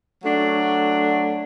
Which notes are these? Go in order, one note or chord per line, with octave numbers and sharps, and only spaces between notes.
F#3 A3 D4